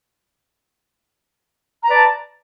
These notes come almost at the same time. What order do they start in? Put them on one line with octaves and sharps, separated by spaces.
A#5 B4 D5 A5